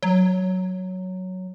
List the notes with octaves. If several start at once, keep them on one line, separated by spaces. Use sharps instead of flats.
F#3